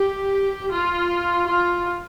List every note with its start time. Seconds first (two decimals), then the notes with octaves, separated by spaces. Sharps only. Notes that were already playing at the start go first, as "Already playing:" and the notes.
Already playing: G4
0.70 F4
1.48 F4